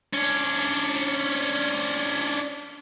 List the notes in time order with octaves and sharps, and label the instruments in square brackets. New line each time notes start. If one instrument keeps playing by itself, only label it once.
[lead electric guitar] C#4 D4